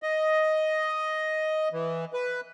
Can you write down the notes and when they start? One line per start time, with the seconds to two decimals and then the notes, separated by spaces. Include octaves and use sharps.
0.03 D#5
1.73 E3
2.13 B4